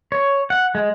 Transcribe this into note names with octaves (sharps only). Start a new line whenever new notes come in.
C#5
F#5
G#3